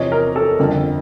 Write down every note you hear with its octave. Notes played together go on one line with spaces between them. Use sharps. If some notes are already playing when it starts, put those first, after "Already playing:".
Already playing: E2 C3 F3 C#5 D#5
A#4
A4
G1 F2 D3